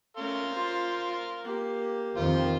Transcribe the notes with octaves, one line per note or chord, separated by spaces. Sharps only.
A3 C#4 A#4 F5 C6
F4 C5
A#3 G4
F2 D#3 F4 C5